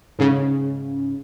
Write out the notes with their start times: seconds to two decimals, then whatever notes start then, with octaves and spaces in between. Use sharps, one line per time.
0.19 G#2 C#3